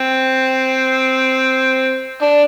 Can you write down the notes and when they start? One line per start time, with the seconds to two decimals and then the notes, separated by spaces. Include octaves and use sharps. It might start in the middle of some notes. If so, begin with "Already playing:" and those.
Already playing: C4
2.22 D4